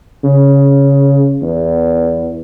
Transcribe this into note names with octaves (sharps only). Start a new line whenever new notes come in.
C#3
E2